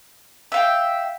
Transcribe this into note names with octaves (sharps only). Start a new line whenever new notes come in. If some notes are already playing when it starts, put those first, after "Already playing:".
E5 F5 G5